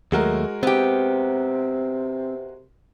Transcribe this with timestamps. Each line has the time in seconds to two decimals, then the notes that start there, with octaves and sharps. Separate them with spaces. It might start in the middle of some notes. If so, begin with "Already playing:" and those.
0.12 D#2 F#3 G#3 A3 F#4 A#4
0.63 C3 B3 C4 G4